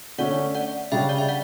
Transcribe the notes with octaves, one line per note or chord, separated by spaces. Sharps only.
D3 A3 C#4 D5 F#5
D5 F#5
C#3 G3 D4 E5 G5
D5
E5
D5 F#5